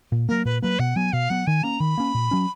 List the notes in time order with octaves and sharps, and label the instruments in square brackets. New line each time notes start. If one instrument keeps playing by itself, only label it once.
[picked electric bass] A#2
[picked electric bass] F#3 A#3 [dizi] A#4
[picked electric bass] A#2 [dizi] B4
[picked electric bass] F#3 A#3 [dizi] B4
[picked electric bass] B2 [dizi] F#5
[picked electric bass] F#3 B3 [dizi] G#5
[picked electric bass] B2 [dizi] F5
[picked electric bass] F#3 B3 [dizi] F#5
[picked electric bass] D#3 [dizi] G#5
[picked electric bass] A#3 C#4 [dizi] A#5
[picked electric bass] D#3 [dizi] B5
[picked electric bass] A#3 C#4
A#2
F#3 C#4